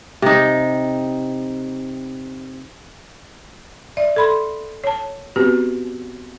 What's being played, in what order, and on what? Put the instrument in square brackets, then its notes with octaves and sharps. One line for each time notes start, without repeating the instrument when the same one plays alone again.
[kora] C3 D#4
[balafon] D5 E5
A4 B5 C6
C#5 A5
B3 C4 F#4 G4 B4